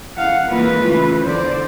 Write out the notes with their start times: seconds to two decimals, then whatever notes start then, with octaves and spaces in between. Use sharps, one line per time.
0.16 F5 F#5
0.49 E3 G#3 A#3 F4 B4
0.81 C#3 E3 A3
1.22 E2 D3 C5 D5